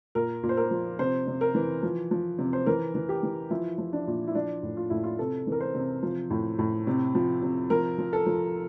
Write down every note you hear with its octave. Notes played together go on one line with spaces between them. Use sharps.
A#2 A#4
A#2
C5
A#4
F3
C3 C5
C3
A#4
E3
F3
F3
C3
C5
E3 A#4
E3
G4
E3
F3 E4
F3
D4
A#2
E4
F3 D4
A2
F4
A2 E4
F4
C3 A4
E3 A#4
C5
C3
F3
A2
A2
C3
F3
C3
F3 A#4
F3
A4
F3